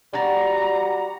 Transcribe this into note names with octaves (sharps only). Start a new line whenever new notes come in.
G3 F#4 D5 A#5